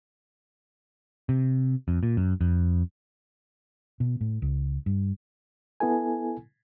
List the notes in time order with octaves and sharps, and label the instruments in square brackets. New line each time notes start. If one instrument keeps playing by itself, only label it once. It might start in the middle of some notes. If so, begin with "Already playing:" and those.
[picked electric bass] C3
F2
A#2
F#2
F2
[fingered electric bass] B2
A2
C#2
G2
[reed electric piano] B3 E4 A4 G#5